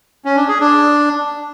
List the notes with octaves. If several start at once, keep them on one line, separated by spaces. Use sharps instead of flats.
C#4
D4
G#4
D4